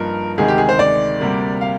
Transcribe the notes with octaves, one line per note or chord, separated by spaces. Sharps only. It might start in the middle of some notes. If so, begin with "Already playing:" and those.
Already playing: G2 F3 A#3 D#4 A#4
D2 C3 D#3 G#3 G#4
G4
G#4
C5
D5
D2 C3 G3 A#3
F5